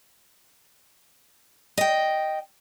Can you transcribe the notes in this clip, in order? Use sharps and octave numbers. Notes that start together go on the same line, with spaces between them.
D#5 G5